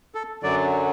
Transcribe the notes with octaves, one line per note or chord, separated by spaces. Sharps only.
A4
F#2 D3 F#3 D5